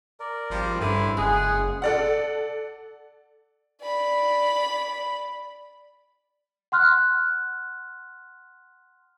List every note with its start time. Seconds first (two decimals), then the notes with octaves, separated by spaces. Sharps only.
0.20 A#4 D5
0.50 G#1 F3 G3
0.80 G2 D3 C#4 E4 C5
1.17 F#1 G#3 G#4 F#5
1.82 A4 D5 F#5
3.82 D5 B5
6.72 F#5 C6 F6 F#6